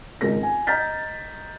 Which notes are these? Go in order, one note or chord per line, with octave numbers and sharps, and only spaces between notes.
G#1 C#2 A#4 A#6
G#5
D#5 A#5 F6 G6 A6 B6